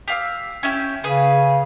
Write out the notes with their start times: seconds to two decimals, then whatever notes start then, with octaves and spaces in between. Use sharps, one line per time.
0.08 G4 F5 E6
0.63 C#4 E4 G4
1.04 C#3 G#4 B4